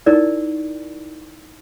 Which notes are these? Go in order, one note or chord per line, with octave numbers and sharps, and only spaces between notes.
D#4 E4 A#4 D5